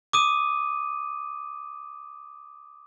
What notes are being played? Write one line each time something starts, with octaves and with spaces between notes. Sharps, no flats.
D6 D#6 D#7